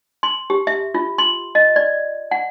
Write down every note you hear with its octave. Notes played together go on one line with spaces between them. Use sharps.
C6
G4
E5
F4
C6
D#5
D5
F#5